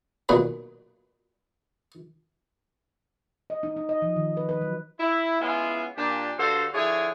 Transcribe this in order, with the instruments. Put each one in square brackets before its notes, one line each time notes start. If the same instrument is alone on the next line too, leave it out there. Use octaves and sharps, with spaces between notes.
[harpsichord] B1 A#2 D#3 F#3 G#4 B4
[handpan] D#5
D#4
D#4
D#5
F3
D#3
B4
B4
F#3
[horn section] E4
G#3 B3 C#4 E4 F4
A#2 D4 G4
G2 D3 F#4 A4 C5 F5
D3 F3 E4 G#4 C#5